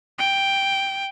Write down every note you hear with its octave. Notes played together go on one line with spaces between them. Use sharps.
G5